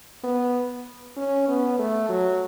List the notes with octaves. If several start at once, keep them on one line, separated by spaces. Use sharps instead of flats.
B3
C#4
B3
A3
F#3